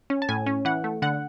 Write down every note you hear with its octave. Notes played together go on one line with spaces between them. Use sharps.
C#4
A5
A2 G#5
C#4
E3 F#5
A3
D3 F#5